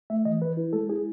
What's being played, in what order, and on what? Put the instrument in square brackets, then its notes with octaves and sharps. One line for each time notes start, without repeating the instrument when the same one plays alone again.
[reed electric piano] A3 E5
E3 D#5
E3 B4
E4
G#3 A4
E4 G#4